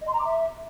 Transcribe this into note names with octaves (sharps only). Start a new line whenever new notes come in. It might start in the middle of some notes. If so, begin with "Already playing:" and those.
D#5
C6
A#5
D6
E5